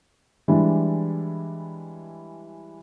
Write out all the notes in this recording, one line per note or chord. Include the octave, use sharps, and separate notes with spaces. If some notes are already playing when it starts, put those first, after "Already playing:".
E3 G3 G#3 D4 E4